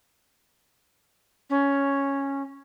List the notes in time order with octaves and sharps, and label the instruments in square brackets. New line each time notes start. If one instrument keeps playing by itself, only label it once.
[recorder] C#4